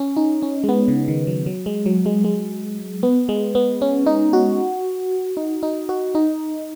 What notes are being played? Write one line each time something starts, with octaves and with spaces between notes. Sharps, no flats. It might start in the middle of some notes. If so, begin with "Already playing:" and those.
Already playing: C#4
D#4
C#4
G#3
B3
C#3
D#3
F#3
F#3
G#3
F#3
G#3
G#3
B3
G#3
B3
C#4
D#4
F#4
D#4
D#4
F#4
D#4